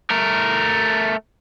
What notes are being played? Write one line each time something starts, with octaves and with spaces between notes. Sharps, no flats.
A3 A#4